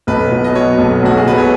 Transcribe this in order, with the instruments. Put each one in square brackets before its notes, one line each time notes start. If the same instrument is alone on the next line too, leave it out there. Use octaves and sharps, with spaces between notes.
[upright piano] B1 [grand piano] B4
[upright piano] B2
[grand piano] D#5
[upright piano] F#3 [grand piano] C#5
[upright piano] B1
[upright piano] B1 [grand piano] F#4
[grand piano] G#4
[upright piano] B2 [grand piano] B4
[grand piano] C#5